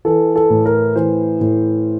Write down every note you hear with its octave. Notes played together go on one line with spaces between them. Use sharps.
E3 A4
A4
A2
A#4
E3 C5
A2